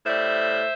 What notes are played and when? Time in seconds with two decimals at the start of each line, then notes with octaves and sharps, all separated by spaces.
0.04 A2 G3 C5 E5